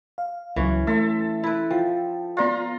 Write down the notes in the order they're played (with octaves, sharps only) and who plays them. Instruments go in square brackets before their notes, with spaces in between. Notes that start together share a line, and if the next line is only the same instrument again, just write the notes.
[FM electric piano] F5
[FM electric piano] C#2 F#3 [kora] E3 C#4
[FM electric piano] A3 C6 [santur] A4 E5
[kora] E4 B4
[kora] F3 [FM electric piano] G5
[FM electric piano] B3 D5 F5 [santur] F4 A#5 C6